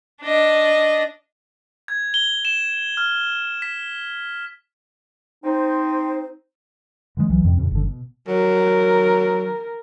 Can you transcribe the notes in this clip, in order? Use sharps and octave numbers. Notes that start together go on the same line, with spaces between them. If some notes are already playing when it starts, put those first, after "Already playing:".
D4 D#5
G#6
G7
E7
F6
B6
C4 D#4 C5
D3 E3 F#3 G#3
C2 E3 F#3
F2 G#2 C3 C4
F2 A#2 C#3
G1 D3
B2
F#3 A#4